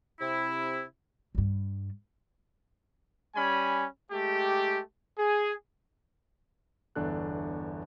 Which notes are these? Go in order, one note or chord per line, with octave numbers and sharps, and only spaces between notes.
C3 E4
G2 G3
G3 C#4 G#5 B5
G#3 A3 G4
G#4
G1 E2 D4 A4 F#6